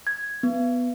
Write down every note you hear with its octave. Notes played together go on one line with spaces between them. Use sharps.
G#6
B3